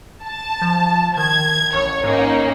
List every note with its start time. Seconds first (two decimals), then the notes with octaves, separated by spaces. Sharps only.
0.23 A5
0.62 F3
1.17 D#3 G#6
1.74 A1 C#5
2.04 G#2 A#3 C#4 D#4